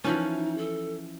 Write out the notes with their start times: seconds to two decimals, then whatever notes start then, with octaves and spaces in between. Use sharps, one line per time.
0.04 E3 F3 C#4 D#4
0.58 A4